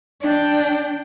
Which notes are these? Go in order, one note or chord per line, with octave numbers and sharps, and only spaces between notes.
D4 G5